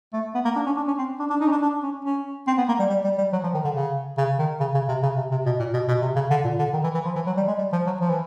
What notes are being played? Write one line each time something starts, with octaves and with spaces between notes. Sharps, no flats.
A3
B3
A#3
D4
C#4
D4
C#4
C4
D4
D4
D#4
C#4
D4
D4
C#4
C#4
C4
B3
A#3
G3
G3
G3
G3
F#3
F3
D#3
D3
C#3
C#3
D#3
C#3
C#3
C3
C#3
C3
C3
B2
A#2
B2
B2
C3
C#3
D3
A#2
D3
D#3
E3
E3
F3
E3
F#3
G3
G#3
G3
F3
F#3
F3
E3